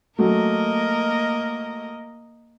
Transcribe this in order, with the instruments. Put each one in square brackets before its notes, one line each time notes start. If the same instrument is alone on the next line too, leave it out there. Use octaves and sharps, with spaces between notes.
[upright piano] F#3 A3 [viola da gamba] A#3 A#4 D#5